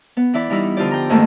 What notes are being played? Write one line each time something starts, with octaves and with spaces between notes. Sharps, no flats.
B3
E3 E4 D5 B5
E3 G3 D#4 E4
D3 F3 F4 G4 D5
G5 A#5
F2 G#2 D#3 A3 A#3 C4